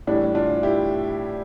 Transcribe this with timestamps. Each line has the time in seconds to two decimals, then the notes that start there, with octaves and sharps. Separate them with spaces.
0.07 A2 E3 G3 D4
0.35 D4 F4
0.63 E4 G4